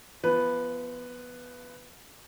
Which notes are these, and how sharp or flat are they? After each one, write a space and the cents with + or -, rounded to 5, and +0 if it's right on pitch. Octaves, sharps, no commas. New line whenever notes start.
F3 -25 B3 +0 B4 +0